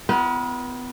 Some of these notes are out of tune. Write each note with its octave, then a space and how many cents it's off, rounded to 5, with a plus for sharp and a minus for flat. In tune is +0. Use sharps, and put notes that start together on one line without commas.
B3 +30 F4 -40 B4 -40